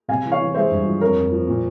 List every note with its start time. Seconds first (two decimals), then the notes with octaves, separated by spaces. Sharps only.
0.08 C3 F5 G#5
0.24 E3
0.31 C#5 F5
0.40 E3
0.54 G#3 C5 E5
0.71 G2
0.85 F3
1.01 F2 A#4 C#5
1.17 F2
1.32 F3
1.47 A#2